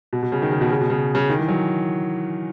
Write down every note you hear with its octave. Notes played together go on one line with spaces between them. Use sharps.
B2
B2
C#3
D#3
C#3
B2
C#3
B2
C#3
C#3
D#3
E3
F#3